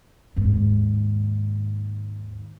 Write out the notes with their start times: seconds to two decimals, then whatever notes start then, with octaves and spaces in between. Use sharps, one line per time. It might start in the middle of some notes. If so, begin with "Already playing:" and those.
0.36 D#2 G#2